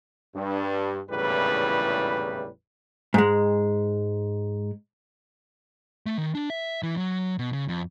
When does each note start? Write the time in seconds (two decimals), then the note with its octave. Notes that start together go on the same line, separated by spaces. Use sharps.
0.35 G2
1.10 G#1 E2 A2 C#3 G3 B4
3.14 G#2 G#3
6.06 A3
6.18 D#3
6.35 D4
6.50 E5
6.83 E3
6.97 F#3
7.39 B2
7.53 C#3
7.68 F2